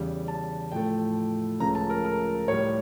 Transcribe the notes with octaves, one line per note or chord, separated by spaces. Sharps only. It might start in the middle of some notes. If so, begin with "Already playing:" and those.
Already playing: E2 C#3 G3
A5
A2 F3 A3 G5
C#2 C#3 F3 A3 A#5
A5
A#4
A#4
A2 G3 C#5